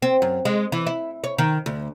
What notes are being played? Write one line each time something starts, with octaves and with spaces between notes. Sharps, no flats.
C4
F#2
G#3
E3
E4
C#5
D#3
D2